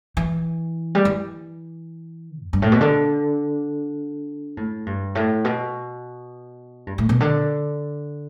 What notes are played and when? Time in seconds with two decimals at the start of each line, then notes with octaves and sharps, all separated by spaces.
0.17 E3
0.95 G3
1.05 E3
2.44 E2
2.53 G2
2.62 A2
2.72 B2
2.81 D3
4.57 A2
4.86 G2
5.15 A2
5.45 B2
6.87 G2
6.98 A2
7.09 B2
7.20 D3